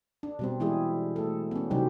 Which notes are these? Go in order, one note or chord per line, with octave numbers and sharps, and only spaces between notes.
D4
B2 G3 C4
E3 G#3 E4 G4 G#4
A3 A4
B3 C#4
C3 F#3 G3 C4 D#4 G4